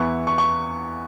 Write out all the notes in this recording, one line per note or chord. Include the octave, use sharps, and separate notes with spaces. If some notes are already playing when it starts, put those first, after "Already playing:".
Already playing: E2 E3 B3 E4 C#6
C#6
C#6